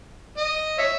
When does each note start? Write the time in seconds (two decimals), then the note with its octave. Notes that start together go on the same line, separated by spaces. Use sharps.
0.37 D#5
0.78 C#5 E5